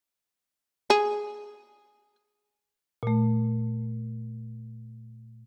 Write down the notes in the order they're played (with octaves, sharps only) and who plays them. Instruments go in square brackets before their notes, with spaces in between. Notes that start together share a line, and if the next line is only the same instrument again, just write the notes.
[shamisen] G#4
[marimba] A#2 A3